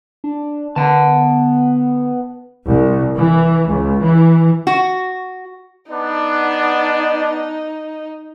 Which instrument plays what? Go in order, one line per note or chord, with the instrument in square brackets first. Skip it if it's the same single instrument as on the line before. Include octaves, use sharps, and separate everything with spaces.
[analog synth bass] D4
[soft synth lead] D3 [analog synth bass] B3 [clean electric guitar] F#5 A5
[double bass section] C2
E3
C#2
E3
[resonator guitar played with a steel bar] F#4
[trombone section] B3 D4 [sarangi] D#4